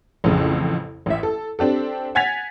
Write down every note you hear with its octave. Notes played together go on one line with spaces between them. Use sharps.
A1 F2 C#3
A1 E5
A4
C4 D4 G4 A4
F#5 G#5 G#6 A6 B6 F7